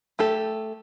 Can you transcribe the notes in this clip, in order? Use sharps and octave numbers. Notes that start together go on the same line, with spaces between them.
A3 G4 A4